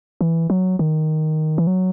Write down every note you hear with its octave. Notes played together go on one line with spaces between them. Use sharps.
E3
F#3
D#3
E3
F#3